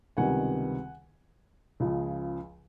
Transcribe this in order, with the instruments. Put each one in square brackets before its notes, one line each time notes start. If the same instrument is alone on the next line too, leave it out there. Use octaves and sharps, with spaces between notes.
[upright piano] C#2 C3 D#3 G3 B3 F#5 G#5
C#2 C#3 F3